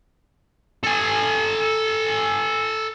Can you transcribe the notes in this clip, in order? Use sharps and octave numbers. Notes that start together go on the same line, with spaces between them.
A4 G#5